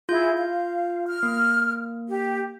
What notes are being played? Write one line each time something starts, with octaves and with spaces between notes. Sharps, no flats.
E4 F4 G#4 G6
F5
F6
A#3
G4